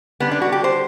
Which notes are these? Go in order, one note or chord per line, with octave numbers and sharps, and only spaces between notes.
D3 G3 B3
D4
F#4
G4
C5